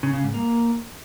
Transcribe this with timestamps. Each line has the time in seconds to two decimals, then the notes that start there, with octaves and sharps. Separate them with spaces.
0.03 C#3
0.13 C#3
0.24 G#2
0.34 A#3